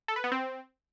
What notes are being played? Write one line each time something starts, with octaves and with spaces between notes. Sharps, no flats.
A4
B4
B3
C4